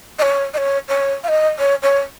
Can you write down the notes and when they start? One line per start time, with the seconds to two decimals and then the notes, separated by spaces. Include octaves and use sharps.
0.18 D#5
0.22 C#5
0.53 D#5
0.57 C#5
0.88 C#5
1.23 F5
1.28 D#5
1.59 C#5
1.82 C#5